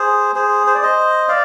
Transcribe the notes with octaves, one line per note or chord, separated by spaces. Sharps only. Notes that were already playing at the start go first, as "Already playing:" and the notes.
Already playing: G#4 C5
G#4 C5
C5
D5
C5 D#5
D5 F5